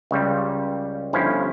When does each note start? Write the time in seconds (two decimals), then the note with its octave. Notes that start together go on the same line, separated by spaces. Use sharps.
0.11 C#2 C#3 G3
1.13 G1 G2 F3 C#4 E4